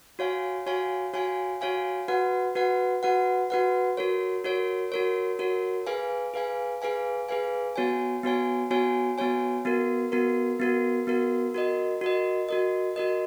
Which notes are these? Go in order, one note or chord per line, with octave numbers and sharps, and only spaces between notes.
F#4 C#5 F5 G#5
F#4 C#5 F5 G#5
F#4 C#5 F5 G#5
F#4 C#5 F5 G#5
F#4 B4 F#5
F#4 B4 F#5
F#4 B4 F#5
F#4 B4 F#5
F#4 A#4 C#5
F#4 A#4 C#5
F#4 A#4 C#5
F#4 A#4 C#5
G#4 B4 F5 G#5
G#4 B4 F5 G#5
G#4 B4 F5 G#5
G#4 B4 F5 G#5
B3 F#4 C#5 G#5
B3 F#4 C#5 G#5
B3 F#4 C#5 G#5
B3 F#4 C#5 G#5
B3 F#4 A#4
B3 F#4 A#4
B3 F#4 A#4
B3 F#4 A#4
F#4 A#4 D#5
F#4 A#4 D#5
F#4 A#4 D#5
F#4 A#4 D#5